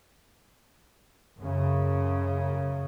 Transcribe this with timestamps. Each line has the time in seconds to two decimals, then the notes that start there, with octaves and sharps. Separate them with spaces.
1.39 F#2 C#3